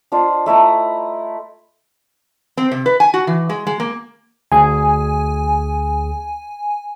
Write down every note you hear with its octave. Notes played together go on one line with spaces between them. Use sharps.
D4 F4 C5 D#5
A3 E4 D#5 A#5
C4
C3
B4
G#5
F#4
E3
G#3
G#3
A#3
D2 G#4 G#5